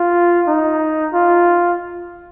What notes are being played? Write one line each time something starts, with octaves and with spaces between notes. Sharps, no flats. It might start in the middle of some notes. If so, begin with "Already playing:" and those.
Already playing: F4
D#4
F4